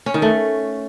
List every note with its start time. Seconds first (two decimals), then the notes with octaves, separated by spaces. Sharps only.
0.06 C#4
0.14 D#3
0.22 A3